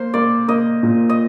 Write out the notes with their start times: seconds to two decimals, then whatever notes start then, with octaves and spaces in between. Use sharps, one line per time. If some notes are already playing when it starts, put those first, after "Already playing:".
Already playing: A#3 C5
0.14 A#3 D5
0.48 A#3 D#5
0.83 A#2
1.09 D#5